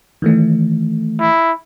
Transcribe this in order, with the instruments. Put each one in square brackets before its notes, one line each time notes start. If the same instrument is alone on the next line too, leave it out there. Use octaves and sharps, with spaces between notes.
[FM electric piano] D#3 E3 A3
[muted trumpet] E4